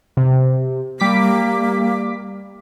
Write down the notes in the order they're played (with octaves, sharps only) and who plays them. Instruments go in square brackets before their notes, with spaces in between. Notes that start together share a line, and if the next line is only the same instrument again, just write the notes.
[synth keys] C3
[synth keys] G3 D6 B6 [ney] A#3